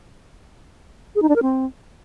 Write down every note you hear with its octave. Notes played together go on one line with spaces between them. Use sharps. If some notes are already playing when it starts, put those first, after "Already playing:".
G#4
D#4
D4
A#4
C4